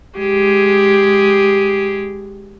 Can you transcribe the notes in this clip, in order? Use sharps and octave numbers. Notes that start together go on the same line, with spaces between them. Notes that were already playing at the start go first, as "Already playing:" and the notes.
G#3 G4 G#4